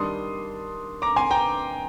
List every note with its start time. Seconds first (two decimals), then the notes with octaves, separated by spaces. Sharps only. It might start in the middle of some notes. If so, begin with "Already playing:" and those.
Already playing: D#3 G3 D4 C6 D#6
1.02 A#5 D6
1.16 G#5 C6
1.31 G5 A#5